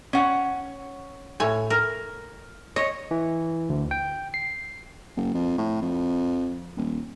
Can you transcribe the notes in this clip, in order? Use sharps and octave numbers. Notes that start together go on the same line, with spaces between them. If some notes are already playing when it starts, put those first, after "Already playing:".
C#4 F#5
A2 C#5 G#5
A#4
C#5 D#5
E3
D2
G5
C7
F#1
F2
A2
F2
D#1